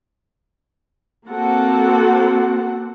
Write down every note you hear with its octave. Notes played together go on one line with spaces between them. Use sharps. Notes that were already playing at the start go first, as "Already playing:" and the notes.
A#3 C4 F#4 A4 F#5